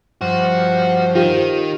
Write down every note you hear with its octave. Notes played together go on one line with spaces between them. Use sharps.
G2 F3 F#4 C5
D#3 F4 G4